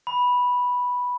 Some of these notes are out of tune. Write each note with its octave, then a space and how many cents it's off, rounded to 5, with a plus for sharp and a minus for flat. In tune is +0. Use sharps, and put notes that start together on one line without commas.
B5 -5